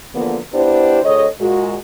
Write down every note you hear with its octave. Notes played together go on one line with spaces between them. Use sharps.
E2 D3 F3 A#3 B3
B3 D4 E4 G4 C5
D2 G#4 A4 C#5 D#5
A#2 G#3 F#4